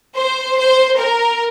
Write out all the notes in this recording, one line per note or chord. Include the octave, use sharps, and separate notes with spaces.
C5
C5
A#4